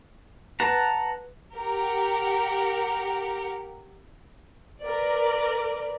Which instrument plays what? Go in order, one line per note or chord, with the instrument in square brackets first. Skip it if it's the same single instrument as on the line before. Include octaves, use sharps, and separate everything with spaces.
[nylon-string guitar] B4 [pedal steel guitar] F#5 A5 A#5
[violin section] G4 A#4 F#5
A#4 B4 D5